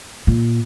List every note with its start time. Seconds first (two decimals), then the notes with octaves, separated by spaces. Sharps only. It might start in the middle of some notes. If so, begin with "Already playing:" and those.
0.27 A#2